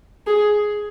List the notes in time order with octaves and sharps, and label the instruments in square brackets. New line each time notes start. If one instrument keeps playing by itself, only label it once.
[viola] G#4